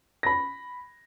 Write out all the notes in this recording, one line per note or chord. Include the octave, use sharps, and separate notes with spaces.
B5 A#6